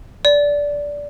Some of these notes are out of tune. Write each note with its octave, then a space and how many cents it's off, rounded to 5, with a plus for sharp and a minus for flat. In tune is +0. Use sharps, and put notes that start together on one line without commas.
D5 -15